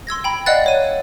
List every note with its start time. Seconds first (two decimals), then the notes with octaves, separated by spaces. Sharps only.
0.07 C6 E6 G#6 A#6
0.24 G5 A#5 B5
0.46 D5 D#5 F5 F#5 F#6 A6
0.66 C#5 D#7